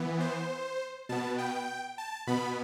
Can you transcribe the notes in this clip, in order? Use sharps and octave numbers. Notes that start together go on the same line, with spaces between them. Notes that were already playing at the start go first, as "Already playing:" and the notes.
Already playing: E3 B3
C5
B2 B3 A5
G5
A5
B2 B3 B5